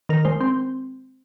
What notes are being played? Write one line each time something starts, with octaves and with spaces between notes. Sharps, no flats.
D#3 A#4
G#3 C5
C4